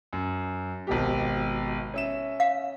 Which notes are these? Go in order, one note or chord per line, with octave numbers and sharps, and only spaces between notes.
F#2
G#1 B2 G4
C#4 E5 E7
F5